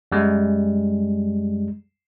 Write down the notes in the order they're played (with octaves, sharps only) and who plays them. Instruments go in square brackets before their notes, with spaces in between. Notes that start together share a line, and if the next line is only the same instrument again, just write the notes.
[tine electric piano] F#2 G3 G#3